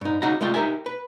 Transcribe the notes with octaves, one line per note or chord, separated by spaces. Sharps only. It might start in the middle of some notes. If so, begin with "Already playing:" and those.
G2 D#4
C#2 C#3 D#4 F#4 F#5 A#5
C2 G#3 A3 F4 G5
D#4 G4 A#4 E5 G#5
B4